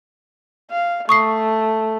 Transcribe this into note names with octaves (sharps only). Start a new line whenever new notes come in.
F5
A3 C#6 D#6 C7